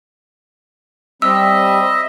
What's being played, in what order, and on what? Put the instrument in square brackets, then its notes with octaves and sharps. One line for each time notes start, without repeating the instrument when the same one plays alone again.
[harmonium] G3 C4 [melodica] D#5 E5 [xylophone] E6